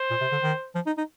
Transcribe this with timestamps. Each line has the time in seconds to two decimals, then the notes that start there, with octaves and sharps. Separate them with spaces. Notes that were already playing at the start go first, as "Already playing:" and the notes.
Already playing: C5
0.10 A#2
0.21 C3
0.32 D3
0.42 D#3
0.75 F3
0.86 D#4
0.98 D#4